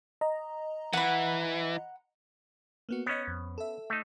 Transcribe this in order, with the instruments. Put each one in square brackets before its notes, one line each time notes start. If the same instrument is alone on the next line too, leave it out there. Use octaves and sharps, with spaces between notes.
[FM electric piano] D#5 A#5
[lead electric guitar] E3 [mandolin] F#5 B5
[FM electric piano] A#3 B3 F#4
[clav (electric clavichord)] B3 C#4 [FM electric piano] C#5 D#5
[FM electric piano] F2
A4 E5
[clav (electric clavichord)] A3 D#4